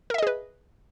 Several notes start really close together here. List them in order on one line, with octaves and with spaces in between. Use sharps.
A#4 E5 D#5 G#4 B4